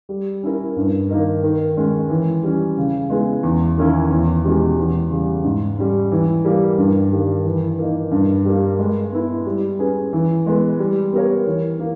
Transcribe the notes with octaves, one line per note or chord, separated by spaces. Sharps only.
G3
C#4 E4 A#4
G2
D#3 A#3 D#4 A#4
D#3
G#3 C#4
E3
G3 C#4
C#3
G#3 B3 E4 G#4
E2
D#3 A#3 C#4 E4
E2
B2 G#3 C#4 G4
E2
C#3 G3
G#2
G3 C#4
E3
G3 A#3
G2
D#3 G3 A#3
E3
A#3 D#4
G2
G3 A#3
G#3
B3 E4
G3
C#4 G#4 B4
E3
G#3 B3
G3
B3 G4 A#4 C#5
E3
A#3